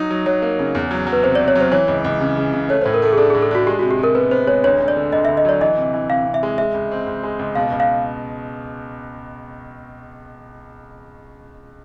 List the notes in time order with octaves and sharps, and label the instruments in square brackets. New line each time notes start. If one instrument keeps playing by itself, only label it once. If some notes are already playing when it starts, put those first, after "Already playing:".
Already playing: [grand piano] F#3 D#4
F#3
[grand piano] F#3 [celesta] C#5
[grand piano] A#3
C#3
E2
F#3
F#3
[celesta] B4
[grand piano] C3 [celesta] C5
[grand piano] C3 [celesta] D5
[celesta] C#5
[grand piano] F#3
[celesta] C5
[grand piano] E3 [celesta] C#5
[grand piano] C#2
C#2
C#3
C#3
C#3
[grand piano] A3 [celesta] C#5
[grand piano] A2 [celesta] C5
[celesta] A#4
[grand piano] A3 [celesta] A4
[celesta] G#4
[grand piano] D4 [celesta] A4
[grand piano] A2 [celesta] G#4
[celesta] A4
[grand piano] D4 [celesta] F#4
[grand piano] G#3 [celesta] G4
[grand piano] C3 [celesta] F#4
[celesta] G4
[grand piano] C3 [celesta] A#4
[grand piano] B3 [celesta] B4
[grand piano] B3 [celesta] C5
[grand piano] G#3 [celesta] C#5
[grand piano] D2 [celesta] C#5
[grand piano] D3
[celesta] D5
[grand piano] D3
[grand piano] D2 [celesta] D#5
[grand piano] D2 [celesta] E5
[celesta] D#5
[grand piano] F#3 [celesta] D5
[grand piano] E3 [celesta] D#5
[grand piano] C3
E3
[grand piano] C3 [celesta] F5
[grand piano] C3
[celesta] E5
[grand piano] G#3
[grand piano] G#3 [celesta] E5
[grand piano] C#2
C4
C#2
G#3
C#2
[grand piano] B2 [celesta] F5
[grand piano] C#2
[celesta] F5